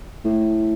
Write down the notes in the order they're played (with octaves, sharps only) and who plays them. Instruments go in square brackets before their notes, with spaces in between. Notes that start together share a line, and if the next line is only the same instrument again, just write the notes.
[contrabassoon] A2